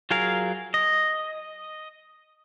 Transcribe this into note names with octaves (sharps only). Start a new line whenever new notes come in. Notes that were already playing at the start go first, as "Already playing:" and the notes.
F#3 F4 G#4 A#4 F5
D#5